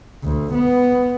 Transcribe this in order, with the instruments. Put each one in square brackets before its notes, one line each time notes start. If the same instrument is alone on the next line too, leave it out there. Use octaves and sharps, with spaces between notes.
[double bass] D2
B3